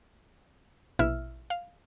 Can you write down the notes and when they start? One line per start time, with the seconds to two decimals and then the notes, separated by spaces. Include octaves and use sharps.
0.99 A#1 B2 E4 E5 E6 F6
1.50 F5